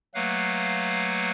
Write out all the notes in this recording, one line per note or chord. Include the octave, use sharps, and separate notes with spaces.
F#3 A3 A#3 B4 F5 F#5